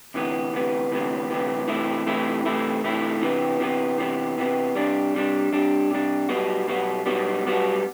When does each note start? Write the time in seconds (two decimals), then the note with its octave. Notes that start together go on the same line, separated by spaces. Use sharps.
0.14 D2 C3 E3 B3
0.53 D2 C3 E3 B3
0.92 D2 C3 E3 B3
1.30 D2 C3 E3 B3
1.68 C3 E3 A3 E4
2.07 C3 E3 A3 E4
2.46 C3 E3 A3 E4
2.84 C3 E3 A3 E4
3.21 C3 E3 B3
3.60 C3 E3 B3
3.98 C3 E3 B3
4.38 C3 E3 B3
4.75 C3 G3 D4
5.14 C3 G3 D4
5.52 C3 G3 D4
5.90 C3 G3 D4
6.29 B1 B2 G3 B3 F#4
6.67 B1 B2 G3 B3 F#4
7.06 B1 B2 G3 B3 F#4
7.44 B1 B2 G3 B3 F#4